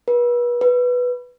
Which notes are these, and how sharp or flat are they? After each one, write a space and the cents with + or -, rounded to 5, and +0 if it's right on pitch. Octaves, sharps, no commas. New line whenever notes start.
B4 -35
B4 +0